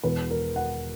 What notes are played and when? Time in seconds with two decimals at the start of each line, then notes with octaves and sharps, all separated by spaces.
0.03 E1 E2 B2 B4
0.31 A#4
0.56 F#5